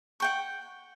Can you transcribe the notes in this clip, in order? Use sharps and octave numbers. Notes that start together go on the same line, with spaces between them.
F#5 G5 C#6